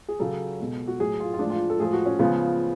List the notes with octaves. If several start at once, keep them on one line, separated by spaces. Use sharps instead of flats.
G#4
C#3 F#3 A4
B2 G#3
F#4
A2 F#3 G#4
F4
F4
A2 F3 G#3 D4
F4
A4
A2 F3 G#3 G#4
F#4
C#4
C#3 F3 G#3 B3